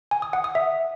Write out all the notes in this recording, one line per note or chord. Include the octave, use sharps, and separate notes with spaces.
G#5
D#6
F#5
D#6
E5